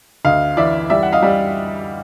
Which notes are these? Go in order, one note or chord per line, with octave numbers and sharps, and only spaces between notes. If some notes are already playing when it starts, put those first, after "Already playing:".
D2 D#5 F5
E3 D5 E5
G3 D5 E5
F#5
D#5 F5
G3